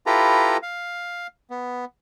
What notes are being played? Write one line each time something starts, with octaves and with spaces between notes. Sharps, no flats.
E4 F4 G4 A4 B4 A#5
F5
B3